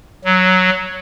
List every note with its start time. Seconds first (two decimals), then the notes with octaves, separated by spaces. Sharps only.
0.24 F#3